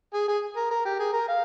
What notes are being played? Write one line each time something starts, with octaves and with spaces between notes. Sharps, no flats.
G#4
G#4
A#4
A#4
G4
G#4
A#4
F5